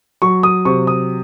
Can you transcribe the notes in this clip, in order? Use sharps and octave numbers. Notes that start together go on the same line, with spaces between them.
F#3 C#6
D#6
C3 C#6
D#6